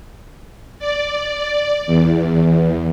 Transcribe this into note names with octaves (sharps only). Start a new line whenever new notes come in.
D5
E2